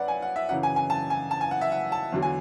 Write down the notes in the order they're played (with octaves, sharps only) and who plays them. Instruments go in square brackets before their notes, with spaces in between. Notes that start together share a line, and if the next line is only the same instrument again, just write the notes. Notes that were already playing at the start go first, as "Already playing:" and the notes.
Already playing: [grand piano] F#2 B4 D5 F#5
G#5
F#5
E5
F#2 C#3 E3 F#5
G#5
G#5
A5
G#5
A5
G#5
F#5
E5
F#5
A5
E2 D3 F#3
G#5